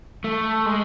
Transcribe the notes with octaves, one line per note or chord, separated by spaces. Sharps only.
A3
G#3